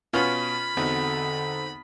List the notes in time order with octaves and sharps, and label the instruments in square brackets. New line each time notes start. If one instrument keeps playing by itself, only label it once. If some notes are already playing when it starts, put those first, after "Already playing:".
[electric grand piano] B2 F5 [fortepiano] B3 C#4 F4 [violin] B5
[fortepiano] E2 [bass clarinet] D3 [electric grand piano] C4 D#4 F#4